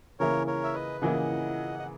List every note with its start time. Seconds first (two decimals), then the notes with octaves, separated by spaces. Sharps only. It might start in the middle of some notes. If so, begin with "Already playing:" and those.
0.20 C#3 E3 A#3 E4 A#4 C#5
0.47 A#4 C#5
0.64 E5
0.74 B4 D#5
1.01 C#3 E3 A#3 E4 D#5 F#5
1.79 D#5